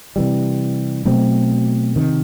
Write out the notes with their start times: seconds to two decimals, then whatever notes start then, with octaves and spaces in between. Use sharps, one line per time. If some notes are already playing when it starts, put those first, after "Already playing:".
0.16 C3 E3 G3
1.05 B2 F#3 A3 C4
1.96 C3 D#3